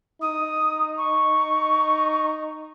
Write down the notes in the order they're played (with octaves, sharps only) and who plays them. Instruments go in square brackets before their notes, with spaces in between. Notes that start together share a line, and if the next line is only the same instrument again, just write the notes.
[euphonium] D#4 [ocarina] D#6
[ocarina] C#6